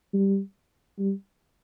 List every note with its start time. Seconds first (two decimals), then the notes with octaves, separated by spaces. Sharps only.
0.14 G3
0.99 G3